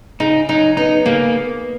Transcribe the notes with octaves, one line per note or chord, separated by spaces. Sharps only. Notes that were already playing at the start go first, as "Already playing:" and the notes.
C#3 D#4
F#3 D#4
B3 D#4
C#3 A#3